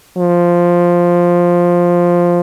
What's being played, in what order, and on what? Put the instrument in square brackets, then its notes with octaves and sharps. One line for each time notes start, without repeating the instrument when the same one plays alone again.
[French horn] F3